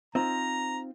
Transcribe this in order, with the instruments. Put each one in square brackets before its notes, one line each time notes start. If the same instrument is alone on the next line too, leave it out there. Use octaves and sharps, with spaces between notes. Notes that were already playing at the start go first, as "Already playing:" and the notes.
[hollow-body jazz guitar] C4 D#4 F4 [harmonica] A#5